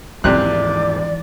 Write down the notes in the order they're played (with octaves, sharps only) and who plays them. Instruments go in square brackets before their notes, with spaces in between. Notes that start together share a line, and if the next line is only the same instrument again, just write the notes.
[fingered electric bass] D#2 G#2 F3 [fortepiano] C3 F#6 [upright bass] E3 [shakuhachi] D5